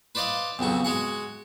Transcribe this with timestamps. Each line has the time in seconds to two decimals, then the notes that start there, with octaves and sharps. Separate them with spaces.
0.15 B4 C5 D5 D#5 F5
0.59 B1 F2 C#3 F#4
0.85 G#3 F#4 G#4 F#5